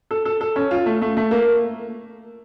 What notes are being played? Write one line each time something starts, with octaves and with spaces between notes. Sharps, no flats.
A4
A4
A4
C#4
F4
A3
A3
A3
A#3